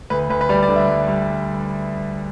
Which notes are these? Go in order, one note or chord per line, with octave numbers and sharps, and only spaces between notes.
D2 B4
D2 B4
B4
G3 D5
D5
D3
E5
G3
G3